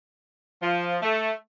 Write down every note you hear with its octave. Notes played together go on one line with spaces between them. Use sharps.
F3
A3